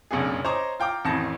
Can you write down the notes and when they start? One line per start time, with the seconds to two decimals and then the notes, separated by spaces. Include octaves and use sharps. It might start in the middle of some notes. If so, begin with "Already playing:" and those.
0.11 F#1 B1 F2 D4 G#4
0.45 C5 C#5 D#5 A#5 C#6 D6
0.80 F4 G5 A#5 D6
1.05 A1 F2 D#3 E3 A5 A#6